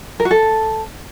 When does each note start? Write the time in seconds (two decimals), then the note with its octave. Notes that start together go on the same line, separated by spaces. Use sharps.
0.20 A#4
0.25 F#4
0.31 A4